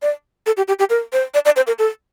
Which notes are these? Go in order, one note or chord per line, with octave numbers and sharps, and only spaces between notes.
D5
A4
G4
G4
G4
A#4
C5
D5
D5
C5
A#4
A4